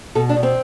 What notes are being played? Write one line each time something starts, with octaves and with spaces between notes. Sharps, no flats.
B2 A4
D4
B2
C4